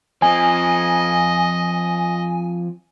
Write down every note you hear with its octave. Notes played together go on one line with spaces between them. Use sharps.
F3 C4 D#5 G#5